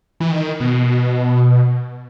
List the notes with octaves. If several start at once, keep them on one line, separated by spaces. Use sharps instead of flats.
E3
D#3
B2